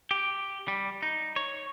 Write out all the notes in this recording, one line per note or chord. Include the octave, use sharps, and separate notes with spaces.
G4
G3
D#4
C#5